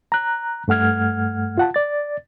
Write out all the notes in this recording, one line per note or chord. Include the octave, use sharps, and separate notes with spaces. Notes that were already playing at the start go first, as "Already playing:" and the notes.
A#5 F#6
G2 A3 F#5 F6 G#6
F4 F#5 A5
D5 A6